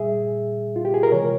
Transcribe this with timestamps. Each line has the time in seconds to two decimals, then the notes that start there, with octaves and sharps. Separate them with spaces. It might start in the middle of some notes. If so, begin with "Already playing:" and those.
Already playing: A#2 G3 G#4 E5
0.76 F4
0.85 G4
0.94 G#4
1.03 A#4
1.12 C3 E3 G#3 C#5